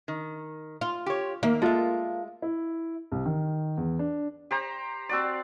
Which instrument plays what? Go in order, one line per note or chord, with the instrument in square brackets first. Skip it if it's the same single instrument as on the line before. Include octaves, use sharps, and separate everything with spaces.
[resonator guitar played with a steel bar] D#3
[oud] F4
[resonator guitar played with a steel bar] G4 C#5
[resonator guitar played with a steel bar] D#3 [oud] A#3 [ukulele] E5
[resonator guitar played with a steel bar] G#3 E5 [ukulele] F4 A4
[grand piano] E4
C2
D#3
E2
D4
[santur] G4 C5 A#5
C4 F#4 D5